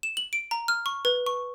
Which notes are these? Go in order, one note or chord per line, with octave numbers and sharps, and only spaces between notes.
E7
F#7
D7
A#5
F6
C#6
B4
C#6